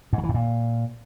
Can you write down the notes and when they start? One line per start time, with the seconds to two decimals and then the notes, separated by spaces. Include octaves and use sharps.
0.13 G#2
0.18 D#3
0.23 E3
0.29 G#2
0.34 A#2